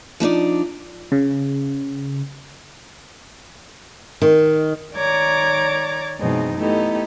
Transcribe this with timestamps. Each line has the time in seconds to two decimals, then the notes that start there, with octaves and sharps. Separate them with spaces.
0.20 F3 D4 D#4 D5
1.12 C#3
4.22 D#3
4.96 D#3 C#5 D5 A#5 D6 G#6
6.19 F#2 B2 E3 G#3 C4 D#4
6.57 A3 B3 D#4 E4 G4 A4